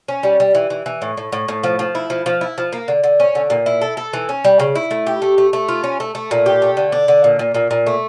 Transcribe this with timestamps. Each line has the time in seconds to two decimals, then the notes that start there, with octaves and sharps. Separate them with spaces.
0.08 C#4
0.23 G3
0.40 G3
0.55 E3
0.70 E3
0.86 E3
1.02 A2
1.17 A2
1.32 A2
1.48 A2
1.63 F3
1.79 F3
1.95 E4
2.10 F3
2.26 F3
2.41 E4
2.58 F3
2.73 A#3
2.88 D3
3.04 D3
3.20 C#4
3.35 D3
3.50 A#2
3.66 E4
3.81 A4
3.97 A4
4.13 E3
4.29 C#4
4.44 G3
4.60 C#3
4.75 E4
4.91 A3
5.07 G4
5.22 A3
5.38 A3
5.53 A3
5.69 F4
5.84 C#4
6.00 A3
6.15 A3
6.31 A#2
6.46 G4
6.62 A3
6.77 D3
6.92 D4
7.08 D3
7.24 A#2
7.39 A#2
7.55 A#2
7.71 A#2
7.87 A3